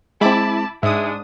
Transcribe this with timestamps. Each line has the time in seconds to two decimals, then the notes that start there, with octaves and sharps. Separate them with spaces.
0.21 G#3 C4 E4 A5 B5 D6
0.83 G#2 G#3 D4 E5 D#6